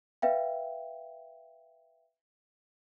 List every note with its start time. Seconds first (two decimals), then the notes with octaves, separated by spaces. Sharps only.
0.22 B4 E5 F5 G5